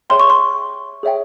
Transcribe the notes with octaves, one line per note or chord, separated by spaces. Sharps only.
G#4 C#5 E5 G5 C6
C#6
C6
G#4 C#5 E5 G5